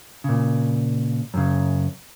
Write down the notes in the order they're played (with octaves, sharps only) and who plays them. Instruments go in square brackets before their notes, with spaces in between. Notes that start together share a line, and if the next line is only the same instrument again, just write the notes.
[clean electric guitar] A#2 C#3
F#2 C#3